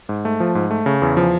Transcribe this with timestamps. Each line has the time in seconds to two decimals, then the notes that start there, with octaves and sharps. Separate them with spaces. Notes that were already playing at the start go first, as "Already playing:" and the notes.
0.09 G#2
0.25 A3
0.40 F3
0.55 G#2
0.71 A3
0.86 C#3
1.02 E2
1.17 F3